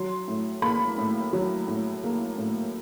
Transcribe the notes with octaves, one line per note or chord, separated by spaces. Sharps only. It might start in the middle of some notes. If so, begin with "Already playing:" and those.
Already playing: F#3 C6
A2
A#3 B5
A2
F#3
A2
A#3
A2